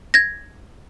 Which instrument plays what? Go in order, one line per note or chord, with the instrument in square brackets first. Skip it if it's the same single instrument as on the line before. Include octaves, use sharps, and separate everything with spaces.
[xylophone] G#6 A#6